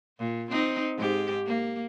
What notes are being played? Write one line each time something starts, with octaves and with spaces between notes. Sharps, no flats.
A#2
C4 D#4
G#2 G4
A#3